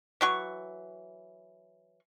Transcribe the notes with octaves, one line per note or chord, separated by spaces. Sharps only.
E3 F#3 C#6